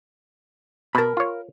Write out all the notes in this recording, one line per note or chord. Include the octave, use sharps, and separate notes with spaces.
B2 A#4 A5 B5
F4 C#5